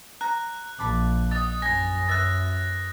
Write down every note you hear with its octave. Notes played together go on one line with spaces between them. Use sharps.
A#5 F#6
A#1 D5 A5 B5
D#5 F#5 D#6 A6
F#2 G#5 B5 A#6
B4 E5 F#6 A6